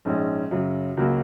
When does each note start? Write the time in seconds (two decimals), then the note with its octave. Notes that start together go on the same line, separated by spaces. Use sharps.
0.05 A#1 G#2 G#3 C#4
0.51 F#2 C#3 F#3
0.97 C#2 C#3 F#3 A#3 F#4